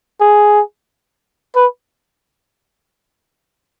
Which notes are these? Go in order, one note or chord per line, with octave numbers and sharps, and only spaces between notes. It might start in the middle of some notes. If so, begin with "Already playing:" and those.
G#4
B4